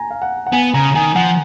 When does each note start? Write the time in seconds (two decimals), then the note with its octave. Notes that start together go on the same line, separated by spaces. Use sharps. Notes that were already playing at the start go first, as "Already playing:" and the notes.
Already playing: G#5 A#5
0.11 F5
0.22 F#5
0.47 F#5
0.53 B3 G#5
0.74 C#3 A#5
0.95 D#3 G#5
1.16 F3 F#5